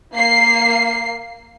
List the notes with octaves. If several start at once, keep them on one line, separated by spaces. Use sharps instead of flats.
A#3 C7